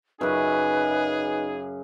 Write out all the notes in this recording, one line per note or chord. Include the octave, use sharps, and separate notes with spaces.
F#2 C#3 D#4 G#4 B4